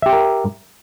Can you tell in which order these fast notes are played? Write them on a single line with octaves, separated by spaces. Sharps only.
E5 G4 G5 A#4